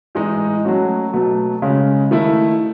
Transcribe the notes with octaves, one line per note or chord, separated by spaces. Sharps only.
A2 E3 G#3 D#4
F#3 A3 C#4 F#4
B2 F#3 A3
C#3 G#3 C#4
D#3 A3 E4